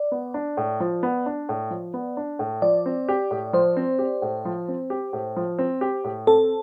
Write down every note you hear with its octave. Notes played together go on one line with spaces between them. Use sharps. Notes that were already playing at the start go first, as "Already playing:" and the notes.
Already playing: D5
B3
D4
A2
F3
B3
D4
A2
F3
B3
D4
A2
F3 D5
C4
G4
A2
F3 C5
C4
G4
A2
F3
C4
G4
A2
F3
C4
G4
A2
C4 A4